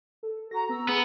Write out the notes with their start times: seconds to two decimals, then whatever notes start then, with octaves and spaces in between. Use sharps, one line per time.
0.23 A4
0.51 F#4 A#5 A#6
0.69 B3 A#5 E6
0.89 B3 G#4